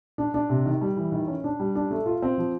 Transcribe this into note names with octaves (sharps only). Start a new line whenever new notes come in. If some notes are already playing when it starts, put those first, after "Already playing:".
D4
D4
C3
D#3
G3
E3
D#3
C#4
D4
G3
D4
A3
F4
C4
F3